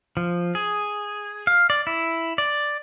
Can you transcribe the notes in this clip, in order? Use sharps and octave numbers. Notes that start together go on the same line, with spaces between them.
F3
G#4
F5
D5
E4
D5